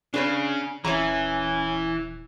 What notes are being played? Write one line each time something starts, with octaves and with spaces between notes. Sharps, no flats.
C#3 D4 B4 C#5
D#1 E3 C#4 C#5 E5 A#5